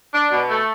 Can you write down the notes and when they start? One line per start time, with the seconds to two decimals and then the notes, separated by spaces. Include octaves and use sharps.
0.14 D4
0.32 B2
0.50 A3